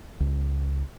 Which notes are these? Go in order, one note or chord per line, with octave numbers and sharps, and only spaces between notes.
C#2